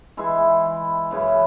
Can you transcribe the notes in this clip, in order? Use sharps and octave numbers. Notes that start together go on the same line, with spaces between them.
E3 G#3 E4
F#2 C#3 E3